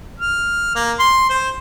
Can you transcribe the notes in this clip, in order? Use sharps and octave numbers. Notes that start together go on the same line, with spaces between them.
F6
A#3
C6
C5